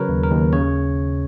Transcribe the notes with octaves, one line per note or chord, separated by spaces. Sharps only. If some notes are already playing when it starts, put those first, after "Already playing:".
Already playing: C#3 F#3 A#4 B4 C#5
D#2
A#4
D#2
C#3 C#5